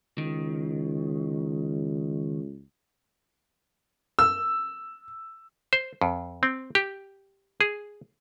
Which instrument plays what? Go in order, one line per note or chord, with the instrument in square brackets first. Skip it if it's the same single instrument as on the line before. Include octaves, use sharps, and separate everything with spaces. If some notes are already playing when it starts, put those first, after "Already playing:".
[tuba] C#2 [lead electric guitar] D#3
[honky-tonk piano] E6
[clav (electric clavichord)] C5
F2
C4
G4
G#4